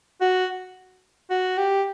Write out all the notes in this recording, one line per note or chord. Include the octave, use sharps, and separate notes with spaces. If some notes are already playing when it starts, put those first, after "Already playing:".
F#4
F#4
G4